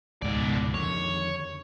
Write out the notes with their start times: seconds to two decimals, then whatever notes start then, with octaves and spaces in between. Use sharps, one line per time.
0.22 C#2 G#2 B2 D#3 D5
0.74 F2 D3 D#3 C#5